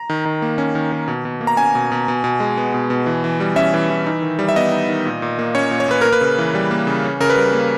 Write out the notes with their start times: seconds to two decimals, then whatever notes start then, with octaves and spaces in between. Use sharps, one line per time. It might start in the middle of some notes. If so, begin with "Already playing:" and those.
Already playing: A#5
0.09 D#3
0.26 D#3
0.42 A#3
0.58 C#4
0.75 D#3
0.92 D#3
1.08 B2
1.25 B2
1.41 A#3
1.47 A#5
1.57 C#4 G#5
1.75 B2
1.92 B2
2.08 B2
2.24 B2
2.40 G#3
2.57 B3
2.74 B2
2.90 B2
3.06 E3
3.24 E3
3.40 G3
3.56 C#4 E5
3.74 E3
3.90 E3
4.06 D#4
4.22 D#3
4.39 G3
4.49 E5
4.56 B3 D#5
4.72 D#4
4.89 D#3
5.06 A#2
5.22 A#2
5.39 A#3
5.55 C#4 C#5
5.71 A#2
5.80 C#5
5.88 A#2 B4
6.01 A#3 A#4
6.13 B4
6.21 C#3
6.38 E3
6.55 G3
6.71 A#3
6.87 C#3
7.05 C#4
7.20 C#3 A#4
7.30 B4
7.37 G3
7.53 A#3